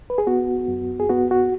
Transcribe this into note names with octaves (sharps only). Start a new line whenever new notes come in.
B4
G#4
B3 F#4
F#2
G#4
B3 F#4
F#4